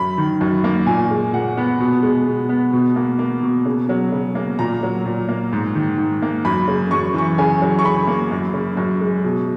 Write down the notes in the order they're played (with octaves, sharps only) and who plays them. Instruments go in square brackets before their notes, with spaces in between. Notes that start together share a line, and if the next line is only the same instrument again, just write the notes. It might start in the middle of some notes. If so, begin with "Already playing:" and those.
Already playing: [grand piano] F#2 B5
D#3
F#2
A#3
A#2 G#5
G#3
A#2 F#5
B3
B2
G#3
B2
B3
B2
A#3
A#3
B2
C#3
F#3
C#3
A#3
A#2 A#5
F#3
A#2
A#3
G#2
D#3
G#2
A#3
F#2 B5
C#3
F#2 C#6
E3 C#6
C#3 G#5
F#3
C#6
C#3 B5
A#3
F#2
C#3
F#2
G#3
B2